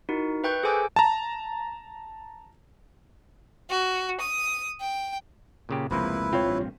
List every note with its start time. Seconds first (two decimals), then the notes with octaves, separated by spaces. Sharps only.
0.09 D#4 E4 F#4 A#4
0.44 B4 E5 G5 C#6 F#6 G6
0.63 G#4 A4 C5 G#5 D6 E6
0.96 A5 A#5
3.70 F#4
4.20 D#6
4.80 G5
5.69 A#2 C#3 G4
5.91 F1 C#2 C3 F3 G#3 A#3 E4 B4
6.33 C4 F4 C#5 F5
6.46 A1 G2